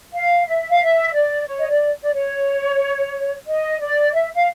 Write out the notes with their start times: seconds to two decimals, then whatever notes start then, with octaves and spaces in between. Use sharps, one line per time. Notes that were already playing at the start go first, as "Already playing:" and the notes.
0.13 F5
0.46 E5
0.70 F5
0.79 E5
1.13 D5
1.47 C#5
1.59 D#5
1.68 D5
2.02 D5
2.13 C#5
3.46 D#5
3.80 D5
4.13 E5
4.35 F5